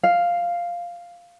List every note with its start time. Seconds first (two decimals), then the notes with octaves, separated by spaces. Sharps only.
0.03 F5